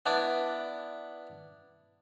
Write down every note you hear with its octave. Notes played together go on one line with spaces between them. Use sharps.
B3 D4 E4 D5